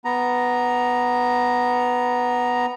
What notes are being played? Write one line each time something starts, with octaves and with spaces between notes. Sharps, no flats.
B3 A#5